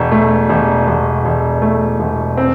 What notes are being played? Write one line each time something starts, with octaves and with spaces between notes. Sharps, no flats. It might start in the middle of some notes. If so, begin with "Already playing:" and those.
Already playing: E1 B2
A3
E1
E1
E1
A3
E1
C4